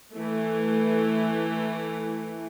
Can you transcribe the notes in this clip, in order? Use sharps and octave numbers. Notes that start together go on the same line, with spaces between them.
E3 A3